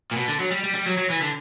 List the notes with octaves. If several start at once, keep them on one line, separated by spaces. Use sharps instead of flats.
A#2
B2
D3
F#3
G3
G3
G3
F#3
F#3
E3
D3